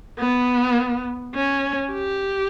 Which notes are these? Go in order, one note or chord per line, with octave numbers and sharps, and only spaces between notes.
B3
C#4
G4